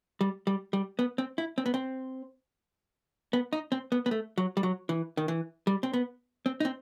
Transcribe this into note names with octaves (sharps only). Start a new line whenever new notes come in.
G3
G3
G3
B3
C4
E4
C4
B3
C4
B3
D#4
C4
B3
B3
A3
F#3
G3
F#3
E3
D#3
E3
G3
C4
B3
C4
D#4
C4